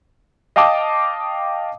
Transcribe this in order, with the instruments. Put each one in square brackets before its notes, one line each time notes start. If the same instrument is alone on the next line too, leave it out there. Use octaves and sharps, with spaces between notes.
[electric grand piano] D#5 F5 G5 A5 D6 D#6